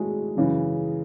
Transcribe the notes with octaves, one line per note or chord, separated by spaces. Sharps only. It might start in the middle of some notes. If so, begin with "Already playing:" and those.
Already playing: D#3 F#3 G#3 A3 E4 F#4 G#4
F#2 C#3 E3